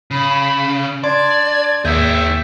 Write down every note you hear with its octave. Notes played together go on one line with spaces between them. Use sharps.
C#3 B5
D4 D5 C6 G#6
D#2 D#3 G#4 E5 G6